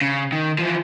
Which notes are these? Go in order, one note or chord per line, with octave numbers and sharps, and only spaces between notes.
C#3
D#3
E3 F3